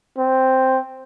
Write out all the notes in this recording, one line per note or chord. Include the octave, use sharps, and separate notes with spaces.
C4